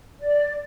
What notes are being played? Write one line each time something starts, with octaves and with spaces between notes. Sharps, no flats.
D5